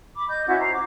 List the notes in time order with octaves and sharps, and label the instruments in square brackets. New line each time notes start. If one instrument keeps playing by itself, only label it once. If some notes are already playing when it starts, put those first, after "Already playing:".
[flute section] B5 D6
D#5 G6
C#4 E4 F#4 F#5
C5 A#5
D6